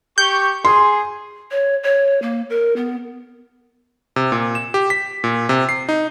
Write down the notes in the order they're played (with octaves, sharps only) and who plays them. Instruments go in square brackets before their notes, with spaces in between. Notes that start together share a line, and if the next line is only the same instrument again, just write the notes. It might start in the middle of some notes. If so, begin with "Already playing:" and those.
[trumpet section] G4 C#6 [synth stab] G6
[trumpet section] G#4 [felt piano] C6
[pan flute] C#5
C#5
A#3
A#4
B3
[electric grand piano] C3
A#2
E7
G4
B6
A#2
C3
C7
D#4